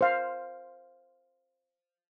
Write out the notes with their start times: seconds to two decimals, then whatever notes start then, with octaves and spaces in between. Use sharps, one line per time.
0.01 C5 F5